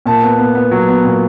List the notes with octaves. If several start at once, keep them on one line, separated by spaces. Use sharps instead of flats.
A#2 A5
B3
B3
B3
F#3
B3
A#2